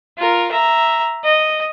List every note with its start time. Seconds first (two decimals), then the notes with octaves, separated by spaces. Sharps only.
0.18 F4 A#4
0.51 E5 A#5
1.24 D#5